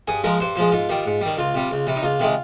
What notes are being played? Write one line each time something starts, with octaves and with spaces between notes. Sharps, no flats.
G2 G#4
F3 G#3 A#4
G2 C5
F3 G#3 C5
G#2 F4
D#3 G3
G#2
D#3 G3
C#2 F4
C3 G3
C#2
C3 G3
D#4
C#2 F4
C3 D#3 G#3